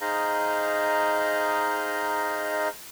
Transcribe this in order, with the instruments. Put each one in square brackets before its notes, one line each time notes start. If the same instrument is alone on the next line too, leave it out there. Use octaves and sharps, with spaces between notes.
[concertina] D#4 G#4 C5 D#5 F5 A#5